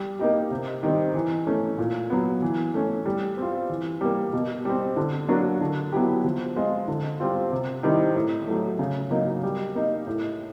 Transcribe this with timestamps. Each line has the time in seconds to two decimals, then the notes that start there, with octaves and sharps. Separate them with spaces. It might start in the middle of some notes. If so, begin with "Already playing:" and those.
Already playing: G3
0.19 A#3 D#4 G4
0.51 C3
0.83 D#3 G3 C4
1.15 E3
1.47 A3 C#4
1.78 A#2
2.10 F#3 B3
2.42 E3
2.74 A3 C#4
3.05 G3
3.37 C4 F4
3.69 E3
4.01 G3 A#3
4.33 B2
4.65 G3 C4
4.96 D3
5.28 F#3 A#3 D4 F#4
5.61 D3
5.92 F#3 B3 E4 G4
6.24 F3
6.56 G#3 C4 F4
6.88 D3
7.20 G3 C4 F4
7.52 C3
7.83 D#3 G3 C4 E4
8.16 A2
8.47 F#3 A3
8.79 C#3
9.11 F#3 A#3 D#4
9.43 G3
9.75 A#3 D#4
10.07 A2